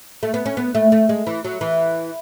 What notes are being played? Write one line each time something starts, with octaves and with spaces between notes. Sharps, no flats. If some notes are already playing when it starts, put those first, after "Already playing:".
A3
B3
C#4
B3
A3
A3
G#3
E3
F#3
E3